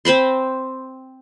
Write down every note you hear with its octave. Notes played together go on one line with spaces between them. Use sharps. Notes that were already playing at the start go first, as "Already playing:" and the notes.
C4 C5 B5 C6